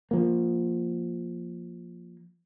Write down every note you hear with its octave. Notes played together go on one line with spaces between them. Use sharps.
F3 A#3